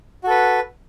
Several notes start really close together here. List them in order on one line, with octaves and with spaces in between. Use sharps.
F#4 A4 B4